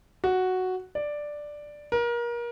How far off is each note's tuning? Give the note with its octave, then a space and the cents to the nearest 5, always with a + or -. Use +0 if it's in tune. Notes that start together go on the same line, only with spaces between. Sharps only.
F#4 +0
D5 +5
A#4 +30